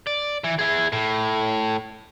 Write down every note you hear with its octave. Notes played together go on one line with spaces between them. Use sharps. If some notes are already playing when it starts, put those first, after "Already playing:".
D5
E3
E4 G#4
A2